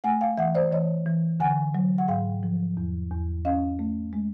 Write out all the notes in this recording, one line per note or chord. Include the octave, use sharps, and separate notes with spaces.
A3 F#5 G#5
F5 G5
E3 E5 F#5
C5 D5
E3 C#5 D#5
E3
D3 F#5 G#5
F#3
F#5
G#2 F5 G5
F3
E2
E2
C#4 D#5 F5
A3
G#3